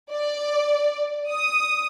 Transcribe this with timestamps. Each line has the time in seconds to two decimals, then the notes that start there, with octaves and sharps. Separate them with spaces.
0.12 D5
1.30 D#6